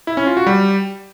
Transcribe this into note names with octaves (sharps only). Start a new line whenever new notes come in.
E4
C#4
F4
F#4
G3